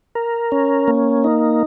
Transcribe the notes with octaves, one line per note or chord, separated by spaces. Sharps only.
A#4
C#4
A#3
D#4